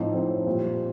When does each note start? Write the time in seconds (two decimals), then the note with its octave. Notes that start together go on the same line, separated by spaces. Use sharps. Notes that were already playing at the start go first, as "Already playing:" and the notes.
Already playing: A2 F3 C4 D#4
0.14 A2 F3 C4 D#4
0.46 A#2 G3 C4 F4